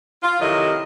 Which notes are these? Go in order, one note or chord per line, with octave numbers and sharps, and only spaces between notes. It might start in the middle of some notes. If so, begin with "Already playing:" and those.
F4
F2 C3 D#3 F#3 E4 D#5